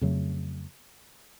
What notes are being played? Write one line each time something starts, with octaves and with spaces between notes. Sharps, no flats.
F2 C#3 F#3 A3